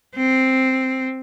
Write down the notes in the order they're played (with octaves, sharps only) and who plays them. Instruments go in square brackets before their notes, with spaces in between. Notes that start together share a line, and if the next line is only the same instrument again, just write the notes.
[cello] C4